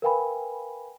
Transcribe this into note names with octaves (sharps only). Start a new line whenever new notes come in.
A#4 B4 F5 G5 G#5 B5